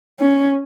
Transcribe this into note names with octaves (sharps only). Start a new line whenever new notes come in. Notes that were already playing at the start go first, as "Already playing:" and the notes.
C#4